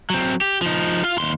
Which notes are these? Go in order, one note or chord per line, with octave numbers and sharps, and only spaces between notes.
F#3 C4
G4
F3 D#4
F4 F5
D#2 C6